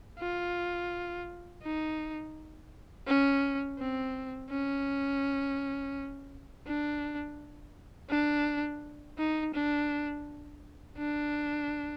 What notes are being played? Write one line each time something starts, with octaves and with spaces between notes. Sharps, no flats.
F4
D#4
C#4
C4
C#4
D4
D4
D#4
D4
D4